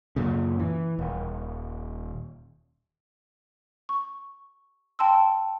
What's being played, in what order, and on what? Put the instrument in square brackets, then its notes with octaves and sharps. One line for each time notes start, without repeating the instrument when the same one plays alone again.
[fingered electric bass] F#2 A#2 C#3
E3
D#1
[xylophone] C#6
G5 A5 C6 E6